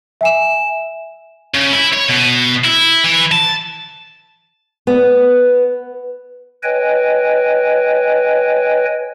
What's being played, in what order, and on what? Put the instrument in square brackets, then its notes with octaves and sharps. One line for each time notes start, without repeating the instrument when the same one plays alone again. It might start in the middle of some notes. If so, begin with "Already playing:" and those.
[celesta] E5 G#5 E7
[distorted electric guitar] C#3
E4
C#5
B2
E4
E3
A5
[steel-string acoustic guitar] B3
[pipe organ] B4 C#5 D#5 G5 G#5